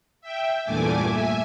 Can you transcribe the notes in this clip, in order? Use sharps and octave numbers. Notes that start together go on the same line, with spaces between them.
E5 G5
E2 G2 A#2 A3 G#5 D6
E5 G#5